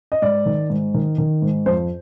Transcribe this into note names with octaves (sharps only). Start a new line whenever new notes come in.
D#5
G#2 D5
D#3
G#2
D#3
D#3
G#2
F2 C5